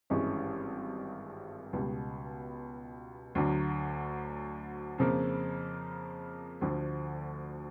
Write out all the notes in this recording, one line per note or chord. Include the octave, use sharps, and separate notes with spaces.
G#1 G2 E3 G#3 C#4
C#2 B2 G3
D2 D3 F#3
F2 C#3 F3 A#3
D2 D3 F3